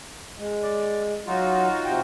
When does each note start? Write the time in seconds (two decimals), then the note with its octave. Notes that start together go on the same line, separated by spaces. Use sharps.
0.38 G#3
0.62 D5
1.27 F#3 D#4 F4 F#4
1.85 C3 G5